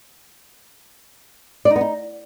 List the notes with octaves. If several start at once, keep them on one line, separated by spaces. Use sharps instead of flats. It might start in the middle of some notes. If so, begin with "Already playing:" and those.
D5
D#4
B3
D#4